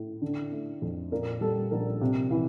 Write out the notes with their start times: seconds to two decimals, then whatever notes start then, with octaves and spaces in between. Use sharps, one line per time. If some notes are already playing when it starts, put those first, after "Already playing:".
Already playing: A2
0.22 D3
0.51 A3
0.82 F2
1.12 A#2 A#4
1.41 G3 A4
1.71 A#1 A#4
2.01 C3
2.31 E3